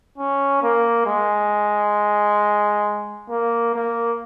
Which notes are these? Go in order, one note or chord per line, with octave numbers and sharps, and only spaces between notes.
C#4
A#3
G#3
A#3
A#3